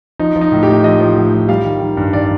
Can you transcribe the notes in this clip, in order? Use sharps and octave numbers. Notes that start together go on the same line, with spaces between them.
F3 D#4
F3
D#4
A2
A2 G4
F3 D#5
F3
A2
F3
G3 F5
D#3
D#3
G2
D#3 D5